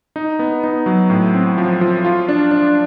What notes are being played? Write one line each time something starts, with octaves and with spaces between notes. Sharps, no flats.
D#4
B3
D#4
F#3
A2
C4
F3
F3
F4
D4
D4